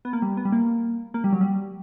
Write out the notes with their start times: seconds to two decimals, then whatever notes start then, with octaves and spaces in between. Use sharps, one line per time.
0.05 B3
0.13 A#3
0.22 G3
0.37 B3
0.45 G3
0.52 A#3
1.14 A#3
1.24 G3
1.32 F#3
1.41 G3